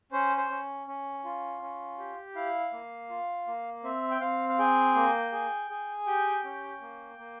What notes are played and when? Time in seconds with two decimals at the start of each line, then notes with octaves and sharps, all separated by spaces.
0.12 C#4 C5
0.37 C5
0.50 C#4
0.87 C#4
1.24 F4
1.61 C#4
1.98 G4
2.35 E4 F5
2.73 A#3
3.10 F4
3.47 A#3
3.84 C4 E5
4.11 G5
4.21 C4 F5
4.49 F5
4.59 G#4 G5
4.95 A#3
5.32 G#4
5.70 G#4
6.07 G4 G5
6.44 C#4
6.81 A#3
7.18 A#3